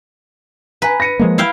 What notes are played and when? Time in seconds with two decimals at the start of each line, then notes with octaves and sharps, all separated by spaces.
0.82 B4 G#5 A#5
1.00 A#6 C#7 D#7
1.19 F3 G#3 A#3
1.38 E4 F5 G5